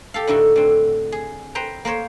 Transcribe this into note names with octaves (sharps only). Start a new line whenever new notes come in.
G4 A4 F5
A2 D3 D#4 E4 F#4
D3 C4
G#4
B4 C5 G5 A#5
A#3 A#4 C5 C#5